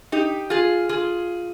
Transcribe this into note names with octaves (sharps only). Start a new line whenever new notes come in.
D#4 G4
F4 G#4
F4 G#4